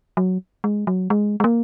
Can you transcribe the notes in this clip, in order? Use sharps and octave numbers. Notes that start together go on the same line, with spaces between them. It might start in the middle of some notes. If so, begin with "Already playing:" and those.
F#3
G#3
F#3
G#3
G#3
A#3